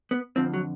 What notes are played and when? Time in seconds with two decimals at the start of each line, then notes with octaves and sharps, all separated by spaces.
0.11 B3
0.36 F2 D3 F3 C4
0.54 F#3